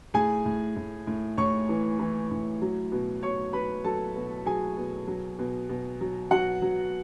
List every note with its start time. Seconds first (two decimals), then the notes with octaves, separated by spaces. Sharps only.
0.14 A2 G#4 G#5
0.45 A2
0.76 A2
1.07 A2
1.37 A2 C#5 C#6
1.69 E3
1.99 E3
2.31 A2
2.62 F#3
2.92 B2
3.23 B2 C#5 C#6
3.53 F#3 B4 B5
3.84 F#3 A4 A5
4.16 B2
4.46 F#3 G#4 G#5
4.77 B2
5.07 F#3
5.39 B2
5.69 B2
6.01 F#3
6.31 F#3 F#4 F#5
6.62 F#3